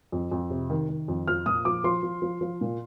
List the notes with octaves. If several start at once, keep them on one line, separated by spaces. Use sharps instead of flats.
F2
F2
C3
D#3
D#3
F2
F3 F6
A#2 D#6
F3 D6
F3 C6
F3
F3
F3
A#2